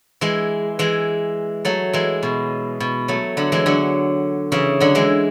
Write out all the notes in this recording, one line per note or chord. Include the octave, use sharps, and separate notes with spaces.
E3 G#3
E3 G#3
F#3 A3
E3 G#3
B2
B2
F#3 A3
D3 F#3
E3 G#3
D3 F#3
C#3 E3
D3 F#3
E3 G#3